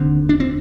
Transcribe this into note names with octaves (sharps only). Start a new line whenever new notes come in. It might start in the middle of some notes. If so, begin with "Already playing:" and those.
Already playing: F1 D#2 D3 C4
D4
C4